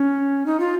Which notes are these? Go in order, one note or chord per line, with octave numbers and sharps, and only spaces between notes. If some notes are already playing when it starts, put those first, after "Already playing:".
Already playing: C#4
D#4
F4